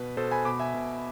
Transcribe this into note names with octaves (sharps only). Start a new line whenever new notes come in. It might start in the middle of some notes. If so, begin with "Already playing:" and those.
Already playing: B2 B4
B2 A4 C5
G#5 B5
B2 B5 D6
E5 G#5
B2